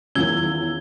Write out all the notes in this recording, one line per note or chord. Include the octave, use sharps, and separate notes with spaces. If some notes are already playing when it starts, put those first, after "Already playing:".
E2 D#3 C#4 F4 E6 G#6 G7